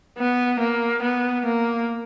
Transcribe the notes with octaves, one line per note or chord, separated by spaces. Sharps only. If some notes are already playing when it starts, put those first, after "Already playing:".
B3
A#3
B3
A#3